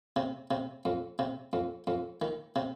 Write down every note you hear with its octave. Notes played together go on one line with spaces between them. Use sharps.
C3
C3
F2
C3
F2
F2
D#3
C3